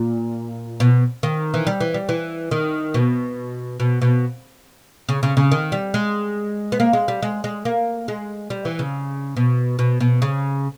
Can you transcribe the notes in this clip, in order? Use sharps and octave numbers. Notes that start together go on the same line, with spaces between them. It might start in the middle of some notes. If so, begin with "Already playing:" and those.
Already playing: A#2
B2
D#3
E3
G3
E3
G3
E3
D#3
B2
B2
B2
C#3
C#3
C#3
D#3
G3
G#3
B3
A#3
G#3
G3
G#3
G#3
A#3
G#3
G3
E3
C#3
B2
B2
B2
C#3